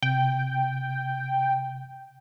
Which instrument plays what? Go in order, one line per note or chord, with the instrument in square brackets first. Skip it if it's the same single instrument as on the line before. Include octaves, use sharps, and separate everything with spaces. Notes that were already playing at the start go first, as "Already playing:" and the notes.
[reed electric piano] C3 [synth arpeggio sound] G5